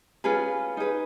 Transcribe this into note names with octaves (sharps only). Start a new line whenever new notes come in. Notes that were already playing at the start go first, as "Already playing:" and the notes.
C#4 F4 G#4 B4
D#4 G#4 B4